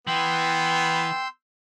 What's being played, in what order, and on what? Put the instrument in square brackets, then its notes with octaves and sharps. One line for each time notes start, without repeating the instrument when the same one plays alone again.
[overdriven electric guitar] E3 [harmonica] B3 [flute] G5 [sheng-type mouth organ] C6 E6 G6